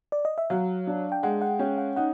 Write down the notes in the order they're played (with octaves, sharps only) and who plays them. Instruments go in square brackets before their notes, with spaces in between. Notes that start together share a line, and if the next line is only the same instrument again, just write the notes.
[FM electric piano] D5
D#5
E5
[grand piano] F#3 [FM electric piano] F5
[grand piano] D4
[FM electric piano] G5
[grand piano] G#3 [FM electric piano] F#5
[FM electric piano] F#5
[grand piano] C#4 [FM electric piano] G5
[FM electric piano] F#5
[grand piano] D#4 [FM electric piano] F#5